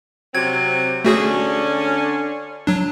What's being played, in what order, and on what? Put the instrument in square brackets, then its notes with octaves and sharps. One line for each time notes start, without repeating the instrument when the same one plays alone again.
[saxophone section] C3 F#3 C4 [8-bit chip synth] G#6
[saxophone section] D3 C#4 D4 [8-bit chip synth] A3 F#4 G#4
[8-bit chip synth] F#3 D4